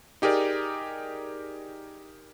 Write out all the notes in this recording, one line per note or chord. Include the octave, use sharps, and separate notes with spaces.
D#4 G4 G#4 A#4 D5